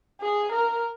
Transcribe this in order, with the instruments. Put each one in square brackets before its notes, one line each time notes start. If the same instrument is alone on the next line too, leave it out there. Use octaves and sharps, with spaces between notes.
[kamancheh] G#4
A#4